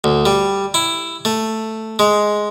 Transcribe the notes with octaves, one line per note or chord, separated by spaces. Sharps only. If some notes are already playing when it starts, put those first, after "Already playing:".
D2
G3
E4
A3
G#3